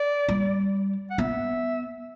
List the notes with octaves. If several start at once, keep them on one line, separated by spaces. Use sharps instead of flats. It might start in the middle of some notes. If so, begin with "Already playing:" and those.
Already playing: D5
G3
F#5
B3 E5